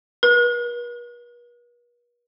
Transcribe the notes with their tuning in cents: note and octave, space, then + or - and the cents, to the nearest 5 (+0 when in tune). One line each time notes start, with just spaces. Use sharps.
B4 -45